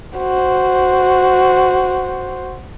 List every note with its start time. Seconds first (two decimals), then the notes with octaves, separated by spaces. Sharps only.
0.18 F#4 C5